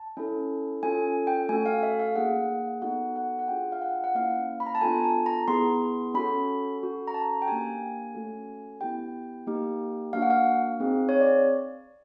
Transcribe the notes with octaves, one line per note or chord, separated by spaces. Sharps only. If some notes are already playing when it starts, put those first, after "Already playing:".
Already playing: A5
C#4 E4 A4
C#4 F4 A4 G#5
G5
A3 C#4 F#4 A4 G#5
F5
E5
F5
A#3 D#4 G#4 F#5
B3 D#4 F#4 A4 F#5
F#5
F#5
D4 F4 G#4 G5
F5
F#5
F#5
A#3 C#4 E4 F5
B5
A#5
A5
B3 D4 F4 A4 G#5
A5
A#5
B3 E4 G#4 C6
C#4 F#4 A4 B5
C#4 F#4 A4
A#5
A5
G5
A#3 D4 G4 G#5
A3 C#4 F#4 A4
B3 E4 G4 G5
A#3 D#4 G4
A#3 D4 F#4 F5
F#5
F5
C4 D#4 G#4
C#5
D5